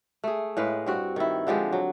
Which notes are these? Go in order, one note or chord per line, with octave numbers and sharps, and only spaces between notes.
A3 G#4
A2 G#3 B4 F5
G2 C4 F#4
D#3 E4
D3 F3 G#3 G4
F#3